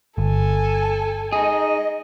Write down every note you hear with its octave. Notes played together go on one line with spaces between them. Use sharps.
G1 A4 G#5
D#4 G#4 D#5